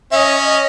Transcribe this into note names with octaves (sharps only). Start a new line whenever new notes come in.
C#4 D#5 E5
D#5